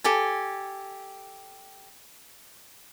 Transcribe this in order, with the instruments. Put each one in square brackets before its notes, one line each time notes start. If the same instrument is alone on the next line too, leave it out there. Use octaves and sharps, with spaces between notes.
[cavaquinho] G4 A4 G#5